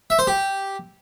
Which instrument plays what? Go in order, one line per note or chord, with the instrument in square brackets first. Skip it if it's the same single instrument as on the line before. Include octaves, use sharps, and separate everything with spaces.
[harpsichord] E5
C5
G4